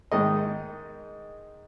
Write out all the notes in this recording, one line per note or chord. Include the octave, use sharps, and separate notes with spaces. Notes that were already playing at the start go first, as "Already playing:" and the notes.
G#2 D#3 D#5